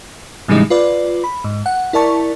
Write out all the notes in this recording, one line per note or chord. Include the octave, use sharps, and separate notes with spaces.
A2 C#3 E3 G3 G#3 D#4
F4 B4 D5
B5
G#2
F#5
E4 A#4 D5 A5 C#6